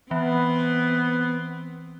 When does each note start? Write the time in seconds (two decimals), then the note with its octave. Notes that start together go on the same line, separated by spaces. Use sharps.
0.11 E3 B3 C4